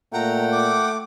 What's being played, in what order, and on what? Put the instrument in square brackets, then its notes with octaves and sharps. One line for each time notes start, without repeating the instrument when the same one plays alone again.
[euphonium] A#2 [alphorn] A3 [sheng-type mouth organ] F#5 G5 [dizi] A#5
[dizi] D6